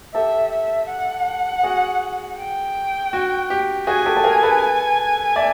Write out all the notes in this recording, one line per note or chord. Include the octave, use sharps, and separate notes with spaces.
G4 A4 E5
E5
F#5
F#4 G#4
G5
F#4
G4
F#4 G#4 G#5
G4 A4
A4
G#4 A#4
A4 B4
D5 E5